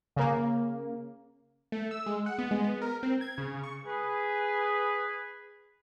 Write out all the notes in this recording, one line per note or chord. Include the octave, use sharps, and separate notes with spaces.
C#3 A#3
A3
E6
G#3
F#5
B3
G#3
B3
A#4
C4
G#6
C#3
C#6
G#4 B4